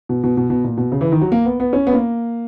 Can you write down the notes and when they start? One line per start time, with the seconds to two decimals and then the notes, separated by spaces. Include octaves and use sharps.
0.09 B2
0.24 B2
0.37 B2
0.50 B2
0.64 A#2
0.77 B2
0.92 C#3
1.01 E3
1.12 D#3
1.21 F#3
1.32 A#3
1.45 B3
1.60 B3
1.73 C#4
1.87 B3
1.93 A#3